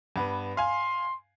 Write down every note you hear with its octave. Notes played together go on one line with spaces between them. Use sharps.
G2 B3
F5 G#5 C6